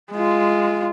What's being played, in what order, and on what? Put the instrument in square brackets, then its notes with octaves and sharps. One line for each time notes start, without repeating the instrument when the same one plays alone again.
[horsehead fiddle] G#3 F4